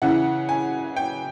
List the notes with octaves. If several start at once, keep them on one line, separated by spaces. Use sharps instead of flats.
C#3 E3 F#5
G#5
G5